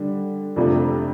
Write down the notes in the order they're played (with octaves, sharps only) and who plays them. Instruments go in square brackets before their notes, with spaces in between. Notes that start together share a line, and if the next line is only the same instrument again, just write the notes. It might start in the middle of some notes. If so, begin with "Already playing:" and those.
Already playing: [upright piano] D3 G3 D4
F2 C3 F3 A3 D4